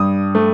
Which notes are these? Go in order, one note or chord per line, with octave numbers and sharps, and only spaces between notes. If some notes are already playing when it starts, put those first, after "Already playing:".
Already playing: G2 D#6
A3